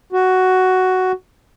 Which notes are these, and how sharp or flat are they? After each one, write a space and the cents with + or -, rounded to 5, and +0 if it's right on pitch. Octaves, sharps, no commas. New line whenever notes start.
F#4 +5